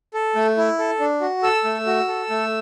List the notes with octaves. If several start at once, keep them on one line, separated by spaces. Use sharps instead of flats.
A4
A3
E4
A4
D4
F#4
A4 E6
A3
F#4
A4
A3